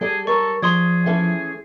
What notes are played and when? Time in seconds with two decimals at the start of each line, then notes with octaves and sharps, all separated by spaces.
0.01 G3 G#4 A4 D5
0.27 A4 A#4 C#5 C#6
0.62 F3 G#4 D5 C6 D#6 G#6
1.06 E3 A3 C#4